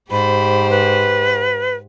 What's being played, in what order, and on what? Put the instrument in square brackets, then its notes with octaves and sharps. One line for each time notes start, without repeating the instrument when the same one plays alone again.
[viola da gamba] G#2 G4 C5 [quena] B5
[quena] B4